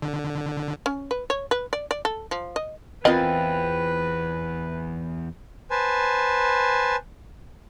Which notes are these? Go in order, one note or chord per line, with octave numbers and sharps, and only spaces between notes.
D3
C#4
B4
C#5
B4
D5
D5
A4
F3
D#5
E2 C4 F4 A#4 B4 D#5 B5
B4 C5 G#5 A5